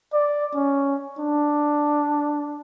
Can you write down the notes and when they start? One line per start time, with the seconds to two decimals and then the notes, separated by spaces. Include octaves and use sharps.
0.13 D5
0.54 C#4
1.18 D4